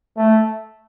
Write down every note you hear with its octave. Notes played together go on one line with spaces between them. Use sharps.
A3